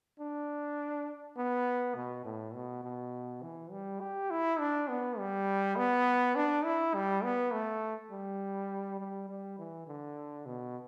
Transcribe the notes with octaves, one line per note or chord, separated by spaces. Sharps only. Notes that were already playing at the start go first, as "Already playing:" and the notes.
D4
B3
B2
A2
B2
B2
E3
G3
G4
E4
D4
B3
G3
B3
D4
E4
G3
B3
A3
G3
G3
G3
E3
D3
B2